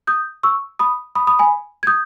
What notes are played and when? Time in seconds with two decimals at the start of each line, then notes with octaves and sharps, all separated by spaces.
0.07 D#6 G6
0.43 C#6 E6
0.79 B5 D#6
1.15 B5 D#6
1.27 B5 D#6
1.39 G#5 B5
1.83 G#6
1.87 D#6 G6